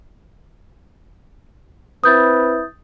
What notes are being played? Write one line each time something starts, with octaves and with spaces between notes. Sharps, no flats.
C4 E4 B4 D#6 G6 A6